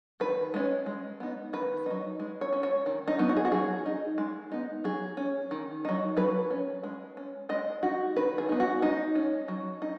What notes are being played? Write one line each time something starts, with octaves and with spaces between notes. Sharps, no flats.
D#3 B4
G#3 C#4
G#3
B3 D#4
D#3 B4
F#3 D#4
G#3
C#5
C#4
C#5
D#3
D#4
F#3 B3 D#4
F#4
G#4
F#4
F#3 G#4
D#4
G#3
B3 D#4
F#3 G#4
C#4
D#3
F#3 D#4
F#3 B4
C#4
G#3
C#4
G#3 D#5
D#4 F#4
D#3 B4
G#4
B3 D#4
F#4
G#3 D#4
C#4
F#3
D#4